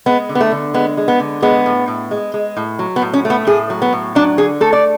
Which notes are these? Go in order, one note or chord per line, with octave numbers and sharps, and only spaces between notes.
G#3 B3
D3
B3
A3
D3
G#3 B3
G#3
B3
D3
G#3 B3
A2
A2
G#3
G#3
A2
F#3
B3
A2
C#4
A3
B3
A2 G#4
F#3
B3
A2
F#3 D4
D3 G#4
A3 A4
D5